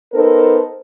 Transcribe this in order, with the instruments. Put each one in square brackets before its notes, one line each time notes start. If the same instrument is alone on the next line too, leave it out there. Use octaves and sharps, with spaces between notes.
[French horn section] B3 D#4 A4 A#4 C5